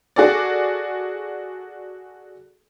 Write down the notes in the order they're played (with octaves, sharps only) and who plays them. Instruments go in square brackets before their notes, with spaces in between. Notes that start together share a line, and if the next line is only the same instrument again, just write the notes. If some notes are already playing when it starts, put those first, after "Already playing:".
[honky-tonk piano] F#4 G#4 A4 D5